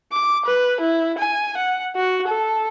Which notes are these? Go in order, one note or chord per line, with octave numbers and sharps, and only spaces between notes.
D6
B4
E4
G#5
F#5
F#4
A4